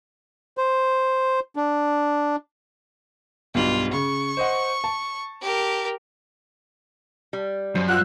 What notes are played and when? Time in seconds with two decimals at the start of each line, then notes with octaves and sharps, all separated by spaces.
0.58 C5
1.56 D4
3.55 B1 G2 F4 F#7
3.93 C#3 C#6
4.37 C5 D#5 F#5
4.84 A5
5.41 G4 A#4
7.33 G3
7.75 F#2 C5
7.88 F4 F#5 E6 F#6